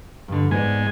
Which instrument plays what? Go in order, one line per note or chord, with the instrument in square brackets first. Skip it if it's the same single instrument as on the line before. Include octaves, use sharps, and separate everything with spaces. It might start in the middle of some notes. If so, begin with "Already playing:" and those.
[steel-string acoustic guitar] G2 D3
[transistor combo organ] G#2 G#5 [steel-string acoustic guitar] B3 D5